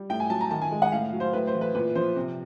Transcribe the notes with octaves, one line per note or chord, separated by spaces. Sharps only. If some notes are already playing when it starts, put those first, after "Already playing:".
Already playing: G3
A2 G5
G#5
F#3 A5
A#5
D#3 A5
G#5
G#3
F#5
A2 F5
F#3
C5
A2 B4
C5
E3
B4
A#2 B4
F3 C5
C3